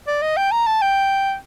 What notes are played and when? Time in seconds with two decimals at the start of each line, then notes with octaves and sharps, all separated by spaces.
0.07 D5
0.22 D#5
0.37 G5
0.51 A#5
0.66 A5
0.81 G5